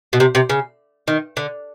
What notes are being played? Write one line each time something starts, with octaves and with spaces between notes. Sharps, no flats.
B2
C3
C3
C#3
D#3
D3